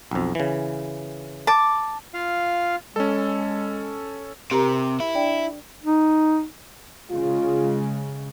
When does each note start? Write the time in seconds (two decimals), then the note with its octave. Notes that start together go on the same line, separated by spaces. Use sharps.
0.11 B1 F2
0.35 C#3 E3
1.47 A5 D6
2.14 F4 F5
2.96 G#3 C#4 A4
4.51 C3 G4 A#4 A#5
5.00 E4
5.15 D4 D5 G5
5.83 D#4
7.12 C#3 G#3 F4